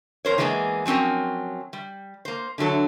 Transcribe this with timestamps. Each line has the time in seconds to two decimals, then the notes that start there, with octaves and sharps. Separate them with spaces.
0.25 F2 A#4 C5 C#5
0.38 E3 G#3 A#3 B3 D4 G#4
0.86 F3 F#3 C4 C#4 A#4
1.73 G3
2.25 A#3 C5
2.58 D3 E3 F#3 A4